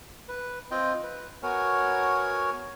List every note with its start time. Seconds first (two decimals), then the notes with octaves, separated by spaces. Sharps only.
0.29 B4
0.71 C4 F4 D#5 G5
1.03 B4
1.43 B3 F#4 A#4 C#5 G#5